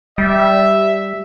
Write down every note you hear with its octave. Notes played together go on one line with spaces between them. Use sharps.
G3 E5